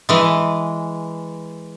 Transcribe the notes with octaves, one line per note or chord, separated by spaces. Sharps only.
E3 G#3